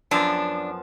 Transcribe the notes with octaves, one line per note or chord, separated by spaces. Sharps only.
F#2 F3 B3 D4